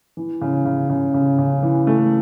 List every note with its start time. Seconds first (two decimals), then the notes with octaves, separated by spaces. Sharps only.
0.17 E3
0.41 C#3
0.65 C#3
0.90 C#3
1.14 C#3
1.38 C#3
1.63 E3
1.87 A3